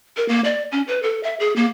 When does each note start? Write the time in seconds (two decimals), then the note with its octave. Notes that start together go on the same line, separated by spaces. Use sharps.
0.17 A#4
0.28 A#3
0.44 D5
0.72 C#4
0.88 B4
1.03 A4
1.23 E5
1.40 G#4
1.56 A#3